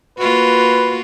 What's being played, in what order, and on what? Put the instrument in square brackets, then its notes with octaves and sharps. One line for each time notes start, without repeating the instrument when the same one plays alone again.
[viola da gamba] A#3 F4 F#4 [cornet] B4